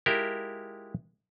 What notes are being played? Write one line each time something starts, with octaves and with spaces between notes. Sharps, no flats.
G#3 E4 F4 G4 A#4